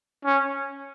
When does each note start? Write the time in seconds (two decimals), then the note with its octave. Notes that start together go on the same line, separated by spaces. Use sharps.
0.25 C#4